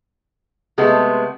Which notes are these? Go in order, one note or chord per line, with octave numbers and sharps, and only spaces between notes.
C3 G#3 A3 B3